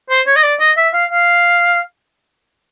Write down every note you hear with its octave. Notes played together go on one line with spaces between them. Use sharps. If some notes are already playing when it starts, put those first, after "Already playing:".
C5
C#5
D#5
D5
D#5
E5
F5
F5